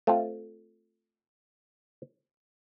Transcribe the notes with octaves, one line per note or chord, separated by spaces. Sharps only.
A3 C4 F4